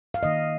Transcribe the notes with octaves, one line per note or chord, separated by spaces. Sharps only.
F5
D#3 A#3 D#5